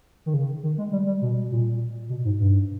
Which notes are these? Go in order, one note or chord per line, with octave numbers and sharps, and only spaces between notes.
D#3
C#3
D#3
G#3
G3
G3
B2
A#2
B2
G#2
G2